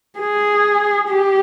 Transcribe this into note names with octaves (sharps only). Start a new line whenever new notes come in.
G#4
G4